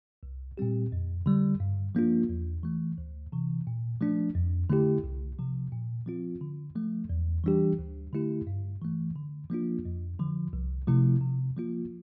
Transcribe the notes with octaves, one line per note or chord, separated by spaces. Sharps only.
C2
A#2 G3 C4 G4
F2
D3 G3
G2
F3 A#3 D4 F4
E2
E3 A3
D2
C3 E3
A#2
F3 A3 D4
F2
D3 A3 E4 G4
C2
C3 F3
A#2
F3 C4 F4
D3
F3 A3
E2
E3 G3 D4 G4
D2
D3 A3 E4 G4
G2
E3 A3
D3
F3 A#3 D4 F4
F2
D3 F3
C2
C3 F3 A3 E4
C3
F3 A#3 F4